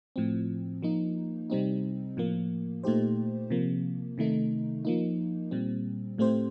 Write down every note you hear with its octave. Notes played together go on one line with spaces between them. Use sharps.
A2 F3 C4
F3 A#3 D#4
C3 G3 C4 D#4
A2 F3 A#3
A#2 A3 D#4 G4 C5
C3 F3 A#3
C3 D#3 A3 D#4
F3 A#3 D#4
A#2 G3 C4
A2 A3 C4 G4 C5